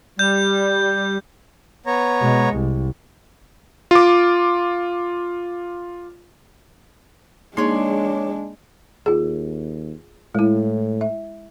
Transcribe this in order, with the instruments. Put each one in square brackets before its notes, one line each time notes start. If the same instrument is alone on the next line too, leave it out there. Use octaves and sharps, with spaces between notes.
[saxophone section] G3 [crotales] G6
[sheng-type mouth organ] B3 C#5 A#5
[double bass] B2 G#3
C2
[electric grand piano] F4 D6
[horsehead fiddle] G#3 D4 [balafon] A#3 D#4 G#4 [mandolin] C#5 D5 C6
[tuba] D#2 [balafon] F4 G#4
[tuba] A2 [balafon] G#3 E4
[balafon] E5